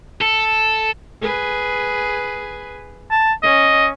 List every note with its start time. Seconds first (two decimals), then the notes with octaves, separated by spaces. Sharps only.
0.21 A4
1.22 G#4 B4
3.11 A5
3.43 C#4 D#5